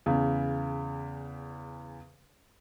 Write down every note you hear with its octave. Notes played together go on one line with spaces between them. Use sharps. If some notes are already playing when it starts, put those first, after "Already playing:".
E2 C#3